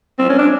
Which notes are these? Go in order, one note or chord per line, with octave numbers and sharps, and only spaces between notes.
C4
C#4
D4